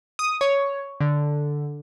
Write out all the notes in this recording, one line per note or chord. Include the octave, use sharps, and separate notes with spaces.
D#6
C#5
D3